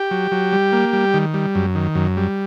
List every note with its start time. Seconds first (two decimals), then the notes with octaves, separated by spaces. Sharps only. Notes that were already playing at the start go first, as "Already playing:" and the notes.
Already playing: G4
0.11 F#3
0.31 F#3
0.52 G3
0.73 A#3
0.93 G3
1.14 D#3
1.34 G3
1.55 F#2
1.75 D#3
1.95 F#2
2.17 G3